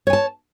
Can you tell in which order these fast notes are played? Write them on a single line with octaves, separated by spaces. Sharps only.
C#5 G#5 A5